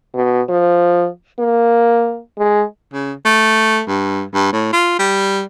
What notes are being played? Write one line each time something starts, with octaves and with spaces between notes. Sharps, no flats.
B2
F3
A#3
G#3
C#3
A3
G2
G2
A2
F4
G3